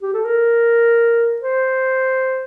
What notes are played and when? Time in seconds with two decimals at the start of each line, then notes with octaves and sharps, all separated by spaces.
0.02 G4
0.14 A4
0.25 A#4
1.42 C5